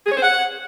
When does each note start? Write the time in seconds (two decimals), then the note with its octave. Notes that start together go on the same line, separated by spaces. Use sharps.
0.07 G#4
0.12 C#5
0.17 C5
0.23 F#5